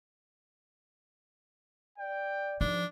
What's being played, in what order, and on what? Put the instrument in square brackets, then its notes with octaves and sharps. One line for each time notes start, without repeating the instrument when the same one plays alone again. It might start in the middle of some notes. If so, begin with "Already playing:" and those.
[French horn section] D5 [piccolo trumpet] G5
[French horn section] G#2 D#4 [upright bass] F3 [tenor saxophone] D4